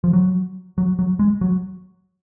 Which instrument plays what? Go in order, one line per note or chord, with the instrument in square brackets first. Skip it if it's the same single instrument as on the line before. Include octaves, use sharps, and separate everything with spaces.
[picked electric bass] F3
F#3
F#3
F#3
G#3
F#3